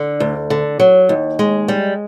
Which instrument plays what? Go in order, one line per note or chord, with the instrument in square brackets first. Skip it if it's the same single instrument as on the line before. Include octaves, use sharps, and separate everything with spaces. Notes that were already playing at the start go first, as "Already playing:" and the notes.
Already playing: [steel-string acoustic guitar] D3
D2
D3
F#3
D#2
G#3
G3